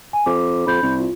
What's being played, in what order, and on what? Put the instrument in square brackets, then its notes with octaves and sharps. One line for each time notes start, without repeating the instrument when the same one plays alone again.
[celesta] G#5
[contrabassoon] F2 [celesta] D6
[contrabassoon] F2 [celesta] B5 G6
[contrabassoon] C2
[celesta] F4